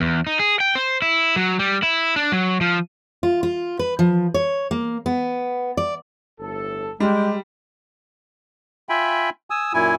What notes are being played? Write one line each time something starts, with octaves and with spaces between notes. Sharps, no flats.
E2
D#4
G#4
G5
C5
E4
F#3
G3
E4
D4
F#3
F3
F4
F4
B4
F3
C#5
A#3
B3
D5
G1 A2 A4
G3 G#3 G4
F4 E5 G5 G#5 B5
G#5 D#6 E6
F#2 A#2 E4 G#5